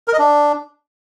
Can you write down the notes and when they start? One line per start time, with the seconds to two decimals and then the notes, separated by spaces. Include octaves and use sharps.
0.08 A#4
0.13 D#5
0.19 D4